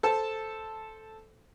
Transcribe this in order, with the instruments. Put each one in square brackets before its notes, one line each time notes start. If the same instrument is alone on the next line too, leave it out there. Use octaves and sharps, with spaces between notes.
[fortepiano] A4 C5 A5